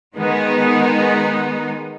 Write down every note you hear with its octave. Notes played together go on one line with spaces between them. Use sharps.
D#3 G#3 B3 D#4